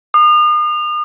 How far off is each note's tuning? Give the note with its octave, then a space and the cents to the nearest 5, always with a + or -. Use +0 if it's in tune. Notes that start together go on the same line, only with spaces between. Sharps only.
D#6 -40